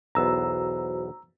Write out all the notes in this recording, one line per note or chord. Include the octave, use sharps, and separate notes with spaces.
B1 E2 B3 F#4 C5 A#5 E6